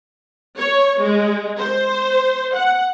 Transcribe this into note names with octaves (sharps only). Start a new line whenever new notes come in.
C#5
G#3
C5
F#5